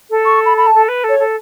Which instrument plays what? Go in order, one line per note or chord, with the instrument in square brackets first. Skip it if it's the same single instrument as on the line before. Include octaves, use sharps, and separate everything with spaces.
[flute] A4
[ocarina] C#6
B5
B5
A5
[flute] A4
B4
A4
[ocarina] C#5
[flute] A4